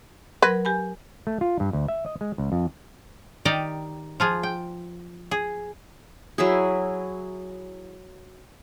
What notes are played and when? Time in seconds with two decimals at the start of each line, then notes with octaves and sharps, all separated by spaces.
0.42 F#3 A#4 B4 G#6
0.65 G4 G#5 B5
1.27 A3
1.41 F4
1.60 G2
1.73 D2
1.88 E5
2.06 D#5
2.21 G#3
2.38 C#2
2.52 F2
3.45 D#3 D#4 G4 D5 D#5
4.20 F3 F4 G#4
4.43 G5
5.31 G#4
6.38 F#3 E4 G#4